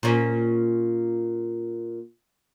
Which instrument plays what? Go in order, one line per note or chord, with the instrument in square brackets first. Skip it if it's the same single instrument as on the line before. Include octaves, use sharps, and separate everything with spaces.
[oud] A#2 C#4